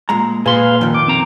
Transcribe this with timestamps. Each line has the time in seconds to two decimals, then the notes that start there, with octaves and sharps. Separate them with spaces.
0.09 A#2 G#3 A#5
0.46 A#2 G#4 B4 F5 C6
0.81 F2 D#3
0.94 D6
1.08 C4 A#5